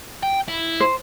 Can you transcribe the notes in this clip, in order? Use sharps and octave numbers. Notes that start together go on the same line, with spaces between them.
G5
E4
C5